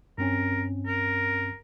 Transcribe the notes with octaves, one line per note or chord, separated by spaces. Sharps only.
G2 C4 C#4 A#4
A#4